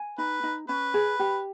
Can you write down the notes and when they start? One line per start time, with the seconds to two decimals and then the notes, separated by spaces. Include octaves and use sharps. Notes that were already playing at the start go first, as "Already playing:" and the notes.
Already playing: G#5
0.18 D#4 B4
0.43 D#4
0.69 C#4 B4
0.94 G#4
1.19 G4